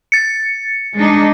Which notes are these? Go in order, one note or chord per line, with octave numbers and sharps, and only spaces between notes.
A6 C#7
G#3 D4 D#4